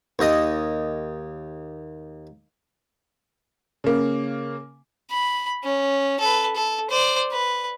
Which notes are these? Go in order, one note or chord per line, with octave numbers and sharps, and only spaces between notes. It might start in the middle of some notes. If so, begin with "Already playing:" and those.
D#2 D#5
C#3 A#3
B5
C#4
A4 B4
A4
C5 D5
B4